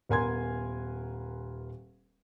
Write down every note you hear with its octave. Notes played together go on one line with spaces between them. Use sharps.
D#1 B3 A#4 G#5 C6 G#6